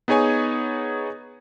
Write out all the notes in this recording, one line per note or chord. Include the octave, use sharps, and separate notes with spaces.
B3 D#4 G#4 C#5 G#5